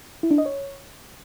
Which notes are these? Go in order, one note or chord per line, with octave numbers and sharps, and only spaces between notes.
E4
D4
D#5
C#5